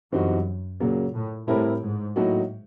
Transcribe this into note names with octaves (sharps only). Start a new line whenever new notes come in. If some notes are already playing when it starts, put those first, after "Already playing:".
F#2 E3 G3 C4 D#4 F#4
A#2 C#3 F#3 A#3
A2
A2 G3 C4 E4 G4 A#4
G#2
A2 F#3 A#3 D#4 F#4